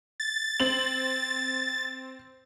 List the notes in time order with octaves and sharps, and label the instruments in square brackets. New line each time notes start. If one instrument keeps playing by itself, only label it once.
[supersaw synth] A6
[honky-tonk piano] C4 F#7